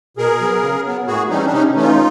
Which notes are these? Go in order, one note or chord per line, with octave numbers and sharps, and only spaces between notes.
B2 G#4 A#4
F#3 B3
C#3
F#3 B3
A2 F#4 G#4
E3 G3 C4 C#4 D#4
D4
C3 C#4 D#4
E3 A3 C#4
D#4 F4